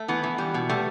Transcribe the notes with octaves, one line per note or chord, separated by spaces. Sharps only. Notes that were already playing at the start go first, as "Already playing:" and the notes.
Already playing: A3
E3 B3
E3
G3
B2
G3 A3